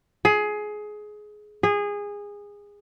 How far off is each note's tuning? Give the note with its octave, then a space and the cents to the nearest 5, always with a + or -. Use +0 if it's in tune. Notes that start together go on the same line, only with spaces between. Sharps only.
G#4 +20
G#4 -20